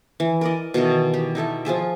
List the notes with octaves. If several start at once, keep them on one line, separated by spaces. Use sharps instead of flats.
E3
A#4 D5 D#5
B2 D#3 E3 A4
G4
D#4 E4 A4 E5
F3 F4 G#4 E5